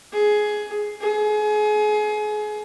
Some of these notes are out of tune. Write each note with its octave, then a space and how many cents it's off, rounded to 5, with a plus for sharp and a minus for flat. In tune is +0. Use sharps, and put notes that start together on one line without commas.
G#4 +15
G#4 +30